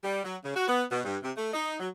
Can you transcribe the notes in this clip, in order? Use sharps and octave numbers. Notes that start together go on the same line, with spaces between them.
G3
F#3
C#3
F#4
B3
B2
G2
C3
A3
D#4
F#3